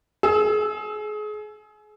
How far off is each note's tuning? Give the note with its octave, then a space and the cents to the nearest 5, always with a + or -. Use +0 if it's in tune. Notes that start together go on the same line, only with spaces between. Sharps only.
G#4 +30 E6 +0